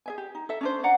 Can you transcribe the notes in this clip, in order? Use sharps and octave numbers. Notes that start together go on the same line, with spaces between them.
G#4 E5 G#5
G4
D#4
A4 E5
C#4 D4 C5
D5 F5 F#5 A#5